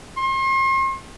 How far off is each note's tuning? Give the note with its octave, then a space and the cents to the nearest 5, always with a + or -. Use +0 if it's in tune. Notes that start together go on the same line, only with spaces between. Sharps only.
C6 +40